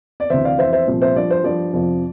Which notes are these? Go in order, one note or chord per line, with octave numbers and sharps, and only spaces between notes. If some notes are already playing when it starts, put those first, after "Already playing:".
D5
D2 C3 E3 C5 E5
D5 F5
F2 E3 C5 E5
C5 E5
C2 A#2 F3
C5 E5
G2 F3 D5
C5
G2 F3 D5
F2 C3 F3